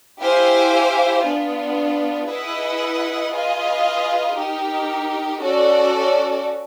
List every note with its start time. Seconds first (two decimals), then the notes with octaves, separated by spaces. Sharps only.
0.20 E4 G4 C5 F5 G#5
1.24 B3 D4 F4
2.28 E4 G#4 B4 D#5 F#5
3.32 F4 G#4 B4 D#5 G#5
4.35 D#4 G4 A#4
5.40 C#4 F#4 A4 D5